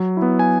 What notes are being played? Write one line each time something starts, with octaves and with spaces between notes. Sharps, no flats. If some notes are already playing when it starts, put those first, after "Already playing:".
Already playing: F#3
E4
B3
G#5